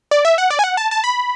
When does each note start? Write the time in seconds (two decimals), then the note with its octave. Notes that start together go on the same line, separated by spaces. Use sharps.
0.11 D5
0.25 E5
0.38 F#5
0.50 D5
0.59 G#5
0.64 F#5
0.77 A5
0.91 A5
1.04 B5